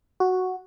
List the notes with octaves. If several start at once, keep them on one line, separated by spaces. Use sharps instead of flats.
F#4